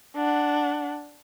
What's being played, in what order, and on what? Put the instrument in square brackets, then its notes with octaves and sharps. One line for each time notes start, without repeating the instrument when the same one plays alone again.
[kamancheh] D4 F#5